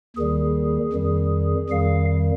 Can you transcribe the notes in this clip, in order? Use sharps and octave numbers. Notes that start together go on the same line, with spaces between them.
D#2 D#3 G3 G#4
F2 D#3 G3
F2 D#3 G3 F5